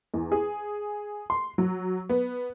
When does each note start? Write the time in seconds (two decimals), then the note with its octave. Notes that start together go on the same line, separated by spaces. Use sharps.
0.14 E2
0.32 G#4
1.30 C6
1.58 F#3
2.09 B3